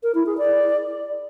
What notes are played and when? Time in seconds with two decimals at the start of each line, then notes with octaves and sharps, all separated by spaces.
0.03 A#4
0.15 E4
0.26 G#4
0.38 D5